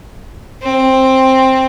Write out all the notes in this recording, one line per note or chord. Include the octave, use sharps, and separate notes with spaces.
C4